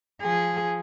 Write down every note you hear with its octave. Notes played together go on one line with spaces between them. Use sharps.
F3 G#4